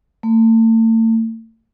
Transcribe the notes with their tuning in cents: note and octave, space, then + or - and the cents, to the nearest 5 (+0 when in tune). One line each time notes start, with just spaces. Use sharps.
A3 +40